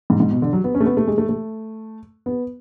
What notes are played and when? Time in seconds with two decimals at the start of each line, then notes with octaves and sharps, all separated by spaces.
0.10 G#2
0.20 G#2
0.31 B2
0.42 D3
0.53 F#3
0.64 B3
0.75 C#4
0.80 A3
0.86 B3
0.97 A3
1.08 G#3
1.18 A3
1.29 A3
2.26 B3